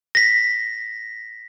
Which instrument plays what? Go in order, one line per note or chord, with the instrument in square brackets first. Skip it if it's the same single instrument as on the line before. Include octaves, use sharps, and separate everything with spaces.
[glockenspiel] A#6 B6